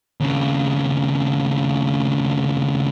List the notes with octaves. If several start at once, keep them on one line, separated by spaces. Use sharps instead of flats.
D#2 C#3